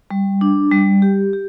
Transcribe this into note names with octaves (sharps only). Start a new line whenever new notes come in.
G3
D4
G3
G4
G4